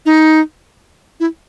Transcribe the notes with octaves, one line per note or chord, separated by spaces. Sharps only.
D#4
E4